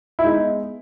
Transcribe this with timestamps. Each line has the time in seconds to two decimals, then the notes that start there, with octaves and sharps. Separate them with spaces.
0.19 E4
0.23 G#3 B3 D#4